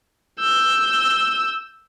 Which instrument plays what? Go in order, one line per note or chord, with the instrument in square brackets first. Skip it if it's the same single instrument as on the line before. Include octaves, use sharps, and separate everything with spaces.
[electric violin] E6 G6